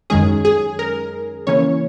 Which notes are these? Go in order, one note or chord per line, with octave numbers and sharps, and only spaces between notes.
F#2 D#3 G#3 C#4 G#4
G#4
A#4
C#3 E3 A#3 C#4 C#5